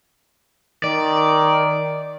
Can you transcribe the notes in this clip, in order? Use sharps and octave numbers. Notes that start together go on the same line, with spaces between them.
D#3 D5